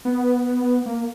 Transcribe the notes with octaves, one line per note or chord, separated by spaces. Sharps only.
B3
A#3